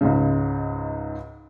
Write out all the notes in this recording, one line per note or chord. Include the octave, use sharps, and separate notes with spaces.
C#2 G#2 C#3